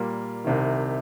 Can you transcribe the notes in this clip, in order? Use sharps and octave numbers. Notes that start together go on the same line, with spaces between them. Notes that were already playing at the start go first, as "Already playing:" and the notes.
Already playing: A#2 G3 A#3
C2 C3 D#3